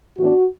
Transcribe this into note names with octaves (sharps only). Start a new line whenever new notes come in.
A2 E3 B3 D4 F#4